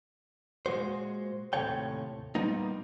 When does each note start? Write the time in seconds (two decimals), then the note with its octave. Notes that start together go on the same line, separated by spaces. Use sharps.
0.66 A#2 G#3 F#4 C5
1.53 D#2 A2 C3 A4 C#5 G5
2.35 A#2 G3 A#3 B3 D#4